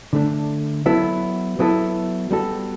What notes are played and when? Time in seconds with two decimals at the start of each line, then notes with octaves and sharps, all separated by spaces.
0.13 D3 A3 D4
0.86 F#3 B3 E4 A4
1.59 F#3 B3 E4 A4
2.31 G3 B3 F#4 A4